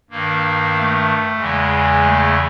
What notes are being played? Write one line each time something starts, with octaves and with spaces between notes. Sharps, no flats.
G2 D#3 A#3
A3
E2 C#3 E3 G#3
A3